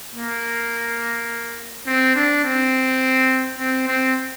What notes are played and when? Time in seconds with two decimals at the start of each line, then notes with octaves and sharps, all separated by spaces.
0.14 A#3
1.86 C4
2.15 D4
2.44 C4
3.58 C4
3.87 C4